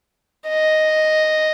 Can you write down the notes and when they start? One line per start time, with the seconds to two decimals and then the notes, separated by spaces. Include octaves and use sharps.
0.48 D#5